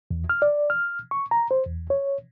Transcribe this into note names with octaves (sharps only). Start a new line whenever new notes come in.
E2
F6
D5
F6
C#6
A#5
C5
E2
C#5